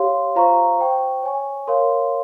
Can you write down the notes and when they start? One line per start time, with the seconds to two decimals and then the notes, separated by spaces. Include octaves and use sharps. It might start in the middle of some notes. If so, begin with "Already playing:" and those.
Already playing: G4 C#5 F5 C6
0.36 F4 C5 F5 A#5 C#6
0.79 C5 G5 C#6
1.23 C#5 G#5 C#6
1.67 A#4 C#5 F5 C6